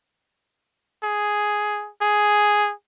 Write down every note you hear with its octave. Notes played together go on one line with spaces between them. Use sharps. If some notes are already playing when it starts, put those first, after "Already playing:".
G#4
G#4